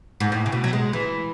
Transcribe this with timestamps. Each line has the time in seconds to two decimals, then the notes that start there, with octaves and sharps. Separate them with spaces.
0.20 G#2
0.32 A2
0.46 C#3
0.52 B2
0.64 F#3
0.73 G#3
0.93 E3